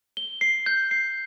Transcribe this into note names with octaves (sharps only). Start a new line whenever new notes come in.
G7
C7
G6
C7